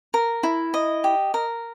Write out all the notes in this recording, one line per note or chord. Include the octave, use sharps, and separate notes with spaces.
A#4
E4
D#5
G4
A#4